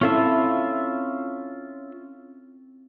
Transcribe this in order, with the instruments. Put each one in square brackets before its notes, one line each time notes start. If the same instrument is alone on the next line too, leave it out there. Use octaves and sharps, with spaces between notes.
[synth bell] C4 [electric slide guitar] C#4 F4 E5 [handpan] E4 A4